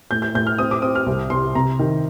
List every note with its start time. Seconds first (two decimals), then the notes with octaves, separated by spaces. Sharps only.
0.11 A2 G6
0.22 G6
0.35 A2 G6
0.47 F6
0.58 C4 D#6
0.71 D6
0.82 C4 D#6
0.95 F6
1.06 C2
1.30 C3 C6
1.55 C3 A#5
1.79 D#3